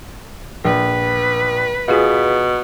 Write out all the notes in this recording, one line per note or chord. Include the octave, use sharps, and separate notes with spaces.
A#1 B4
B2 F4 G#4